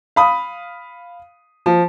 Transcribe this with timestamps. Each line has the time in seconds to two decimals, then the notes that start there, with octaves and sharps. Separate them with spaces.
0.16 F5 B5 D#6
1.66 F3